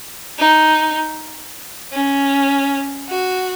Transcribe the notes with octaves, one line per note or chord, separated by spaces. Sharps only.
D#4
C#4
F#4